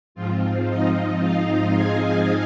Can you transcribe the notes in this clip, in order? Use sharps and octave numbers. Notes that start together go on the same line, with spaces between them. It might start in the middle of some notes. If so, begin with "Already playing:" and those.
G#2 F3 C4 F4
D#4 D#5
F4 F5
G#4 G#5